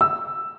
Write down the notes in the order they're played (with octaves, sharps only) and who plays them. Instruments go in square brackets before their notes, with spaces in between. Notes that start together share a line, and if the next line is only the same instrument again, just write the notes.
[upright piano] E6